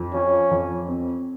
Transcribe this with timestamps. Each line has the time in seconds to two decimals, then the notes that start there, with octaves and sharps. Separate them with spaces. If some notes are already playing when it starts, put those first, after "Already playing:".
Already playing: F2
0.13 F3 C#4
0.51 F2
0.88 C4